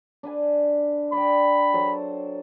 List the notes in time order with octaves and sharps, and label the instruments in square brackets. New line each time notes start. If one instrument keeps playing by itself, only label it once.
[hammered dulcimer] D4 B4 G#5
[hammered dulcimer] D5 G5 [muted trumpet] B5
[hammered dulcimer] F#3 A4 C5